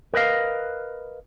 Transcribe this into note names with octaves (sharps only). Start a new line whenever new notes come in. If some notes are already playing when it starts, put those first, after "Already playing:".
A#4 B4 D#5 F5